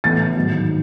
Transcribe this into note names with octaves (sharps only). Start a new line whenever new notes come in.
A2 E3 B3 A6
G#2 D#3 F#3